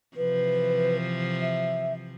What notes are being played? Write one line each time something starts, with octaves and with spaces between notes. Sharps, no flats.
C3 E3 F3 B4
E5